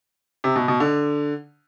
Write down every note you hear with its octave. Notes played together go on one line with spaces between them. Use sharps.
C3
B2
B2
D3